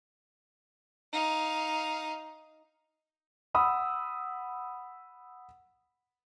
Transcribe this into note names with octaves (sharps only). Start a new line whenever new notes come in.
D#4 F5
F#5 B5 D#6 E6